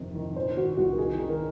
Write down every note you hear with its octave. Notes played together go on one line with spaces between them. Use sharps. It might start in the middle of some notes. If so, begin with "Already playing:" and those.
Already playing: F2 C3 D#3
D#3
A#2 C5
A#2 F#4
C2 F#4
A#4
D#3 G#4
D#3
A#4